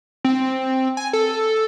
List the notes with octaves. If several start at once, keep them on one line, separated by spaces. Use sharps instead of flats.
C4
G#5
A4